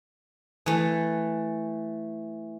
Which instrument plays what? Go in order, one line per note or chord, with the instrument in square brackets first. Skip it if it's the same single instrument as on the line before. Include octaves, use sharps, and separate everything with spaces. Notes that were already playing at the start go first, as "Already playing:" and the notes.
[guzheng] E3 A3